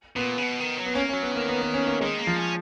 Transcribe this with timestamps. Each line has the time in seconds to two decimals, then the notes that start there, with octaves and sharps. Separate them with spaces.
0.16 A#2 B3
0.38 C#3
0.42 B2
0.60 D#3
0.78 F#3
0.86 B3
0.95 A#3 C#4
1.09 C#4
1.13 F#3
1.22 B3
1.31 D#3 A#3
1.49 B3
1.61 B3
1.74 C#4
1.87 A#3
2.01 D#3 G#3
2.18 A#3
2.27 F3
2.37 C#4